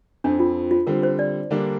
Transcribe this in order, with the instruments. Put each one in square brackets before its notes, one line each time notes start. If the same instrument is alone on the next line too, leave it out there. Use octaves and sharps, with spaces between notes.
[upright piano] F2 F3 C4 [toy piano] D4
[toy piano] F4
F4
[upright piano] D3 G3 C4 [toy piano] A#4
[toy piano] C5
D5
[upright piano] D3 G3 A#3 D4